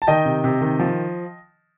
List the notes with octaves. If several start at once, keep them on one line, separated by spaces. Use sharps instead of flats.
A5
D#3 D#5 G5
C3
C3
D#3
F3